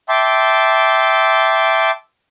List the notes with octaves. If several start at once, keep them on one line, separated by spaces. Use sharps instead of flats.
E5 G5 A5 C6 D6